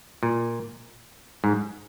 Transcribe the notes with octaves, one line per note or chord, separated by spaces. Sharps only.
A#2
G#2